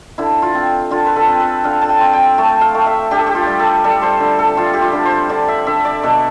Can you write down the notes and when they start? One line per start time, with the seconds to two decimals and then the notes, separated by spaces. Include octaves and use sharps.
0.18 D3 E4
0.42 F4
0.55 C4
0.91 D3 F4
1.06 B4
1.16 A4
1.27 C4
1.40 B4
1.64 D3 F5
1.82 A5
1.89 G5
2.01 C4
2.13 G5
2.38 A3 A5
2.61 F5
2.74 A3
2.86 E5
3.11 D4 G4
3.19 A4
3.26 G4
3.35 F4
3.47 G3
3.59 A4
3.84 G3 A4
4.02 C5
4.20 D3
4.39 A4
4.57 G3 F4
4.73 G4
4.82 F4
4.93 D3
5.05 C5
5.29 D3 D5
5.48 E5
5.67 D3 E5
5.85 D5
6.03 B2 A4